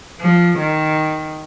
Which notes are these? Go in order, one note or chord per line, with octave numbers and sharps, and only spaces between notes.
F3
D#3